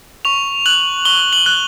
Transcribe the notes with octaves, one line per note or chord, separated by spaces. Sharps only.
C#6 F7
F#6 F#7
C#6 G7
F#7
F#6